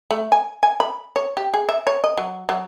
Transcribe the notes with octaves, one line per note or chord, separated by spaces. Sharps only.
A3
G#5
G#5
B5
C#5
G4
G#4
E5
C#5
D#5
F#3
F#3